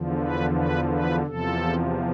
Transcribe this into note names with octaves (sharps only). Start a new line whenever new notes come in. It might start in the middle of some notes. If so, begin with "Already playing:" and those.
Already playing: E2 D3 F3
B4
B4
B4
E2 C3 F3 A4